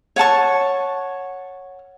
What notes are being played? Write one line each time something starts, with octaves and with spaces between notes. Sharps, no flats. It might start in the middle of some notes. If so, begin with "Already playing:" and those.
C#5 F#5 A5 C#6